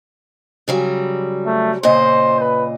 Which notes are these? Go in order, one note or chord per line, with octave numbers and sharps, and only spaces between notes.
C#3 F#3 G3
A3
A#2 C#3 C5 D#5
B4